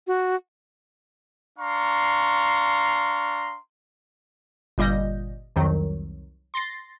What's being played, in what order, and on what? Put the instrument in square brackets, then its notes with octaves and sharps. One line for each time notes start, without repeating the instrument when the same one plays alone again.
[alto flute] F#4
[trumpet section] D4 F5 A#5 C6 C#6
[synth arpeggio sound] G1 A#2 G3 D#5 G6
C2 F2 D#3 F#3
C6 A6 A#6 C7